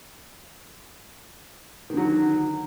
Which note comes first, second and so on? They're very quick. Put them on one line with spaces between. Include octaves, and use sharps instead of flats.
D#3 D3 F#3